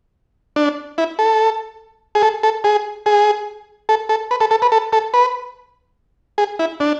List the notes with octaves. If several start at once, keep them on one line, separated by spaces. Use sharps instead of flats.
D4
E4
A4
G#4
A4
A4
G#4
G#4
A4
A4
B4
A4
A4
B4
A4
A4
B4
G#4
E4
D4